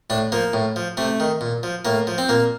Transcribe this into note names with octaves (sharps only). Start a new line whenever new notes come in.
A2 D4
F3 A#3
A2
F3
C3 A3
D#3
A#2
F3
A2 A#3
F3
C4
A#2 A#3